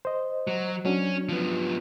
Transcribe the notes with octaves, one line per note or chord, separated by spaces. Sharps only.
C5 D#5
F#3
F#3 C#4 D4
F3 B3